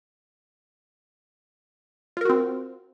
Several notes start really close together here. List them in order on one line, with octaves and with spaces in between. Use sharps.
F4 A#4 F#4 C4